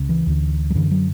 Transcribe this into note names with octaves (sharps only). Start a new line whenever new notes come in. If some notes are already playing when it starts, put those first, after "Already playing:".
Already playing: C#2 C#3
E3
D2 D3
F#3
F#2 D3 E3
F#3